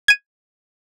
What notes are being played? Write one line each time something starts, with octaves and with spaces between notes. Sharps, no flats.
G#6 D#7